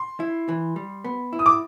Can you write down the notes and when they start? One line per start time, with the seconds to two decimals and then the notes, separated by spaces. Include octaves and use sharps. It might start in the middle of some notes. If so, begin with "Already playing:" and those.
Already playing: C6
0.20 E4
0.49 E3
0.76 G3
1.04 B3
1.33 E4
1.39 D#6
1.46 D6